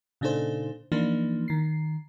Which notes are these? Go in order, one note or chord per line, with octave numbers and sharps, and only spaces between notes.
A#2 C#3 D4 D#4 A4 C5
E3 F3 A#3 D4 D#4
D#3 C7